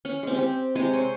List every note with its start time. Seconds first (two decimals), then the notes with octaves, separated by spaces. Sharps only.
0.05 C#4
0.23 G#3 C4
0.35 C4 G4
0.75 C3 G#3 G#5
0.93 C5 C#5